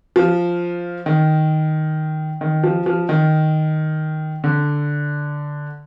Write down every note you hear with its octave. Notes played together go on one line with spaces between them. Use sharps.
F3
D#3
D#3
F3
F3
D#3
D3